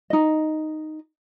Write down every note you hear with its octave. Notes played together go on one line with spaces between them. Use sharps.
D#4 D#5